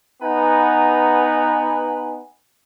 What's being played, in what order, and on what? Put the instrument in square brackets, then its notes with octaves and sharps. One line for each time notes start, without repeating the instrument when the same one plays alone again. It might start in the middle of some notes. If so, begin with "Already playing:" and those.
[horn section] B3 D#4 B4 F#5 G#5 A#5